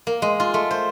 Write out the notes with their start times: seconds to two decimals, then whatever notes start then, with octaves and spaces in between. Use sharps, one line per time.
0.07 A#3
0.22 G#3
0.40 F4
0.54 A3
0.71 C5